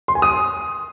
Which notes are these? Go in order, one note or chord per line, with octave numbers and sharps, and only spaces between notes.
C6
G#5
D#6